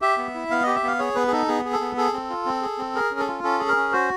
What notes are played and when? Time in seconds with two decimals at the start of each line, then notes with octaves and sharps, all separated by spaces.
0.01 G4 E5
0.18 B3
0.34 E4
0.50 B3 F5
0.63 G4 D#5
0.75 E5
0.83 B3 F5
0.99 G#4 C#5
1.15 B3 B4
1.27 G#4
1.32 D#4 A4
1.48 B3 G#4
1.65 G#4
1.73 A4
1.81 B3
1.97 G#4 A4
2.13 C4
2.30 F4
2.46 C4
2.62 G#4
2.78 C4
2.95 G#4 A#4
3.11 C#4
3.19 A4
3.28 F4
3.43 C#4 A4
3.60 G#4
3.68 A#4
3.76 C#4
3.93 F#4 C5